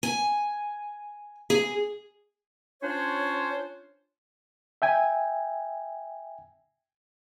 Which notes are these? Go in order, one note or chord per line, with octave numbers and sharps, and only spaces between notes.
G#5
G#4
C#4 D4 F4 C5 C#5
E5 G5 G#5